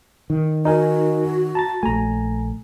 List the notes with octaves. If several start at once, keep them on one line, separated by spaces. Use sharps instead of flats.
D#3
D#4 F#4 A#4 G#5
A5 A#5 A6
A#1 A3 G#5 A#5